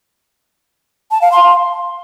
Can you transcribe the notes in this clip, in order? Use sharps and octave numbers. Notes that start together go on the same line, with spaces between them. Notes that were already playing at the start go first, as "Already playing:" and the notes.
A5
F5
C6